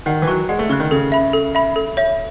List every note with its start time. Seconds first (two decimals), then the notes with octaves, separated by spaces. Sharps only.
0.06 D#3 F#5
0.22 E3
0.27 F#3 C#6 F#6
0.49 G#3 F#5
0.59 A3
0.69 C#3 C#6 F#6
0.80 D#3
0.91 C#3 A4
1.12 E5 B5
1.33 A4
1.55 E5 B5
1.76 A4
1.97 C#5 E5